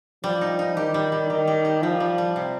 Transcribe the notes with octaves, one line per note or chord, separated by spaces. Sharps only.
F3 G3
D#4
D#4
D#3 G4
G3
G3
D#3 G4
G4
G4
F3 G3
G3
G3
C3